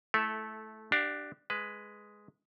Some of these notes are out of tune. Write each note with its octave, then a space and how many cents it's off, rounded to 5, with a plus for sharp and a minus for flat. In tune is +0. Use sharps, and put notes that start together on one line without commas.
A3 -15 E4 +0 A4 +0
D4 +10 G4 -20 F5 +30
G#3 +0 B4 +10